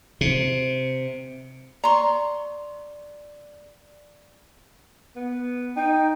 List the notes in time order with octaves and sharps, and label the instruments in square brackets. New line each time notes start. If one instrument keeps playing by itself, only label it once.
[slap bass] C3
[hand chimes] D5 [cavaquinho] A#5 C6 C#6
[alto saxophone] B3
[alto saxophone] D#4 [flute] G5